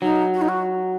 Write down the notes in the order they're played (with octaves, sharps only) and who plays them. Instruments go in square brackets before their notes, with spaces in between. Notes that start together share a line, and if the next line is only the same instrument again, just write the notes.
[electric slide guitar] F#3 [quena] D#4
[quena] F#4
D#4
F#4